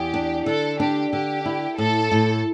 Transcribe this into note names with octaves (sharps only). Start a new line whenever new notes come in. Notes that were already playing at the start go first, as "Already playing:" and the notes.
Already playing: E2 G4
D4
D3 A4
D4 G4
D3 G4
E4
A2 A4
A2